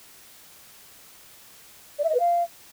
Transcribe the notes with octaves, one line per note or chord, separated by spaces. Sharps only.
D5
E5
D#5
B4
F5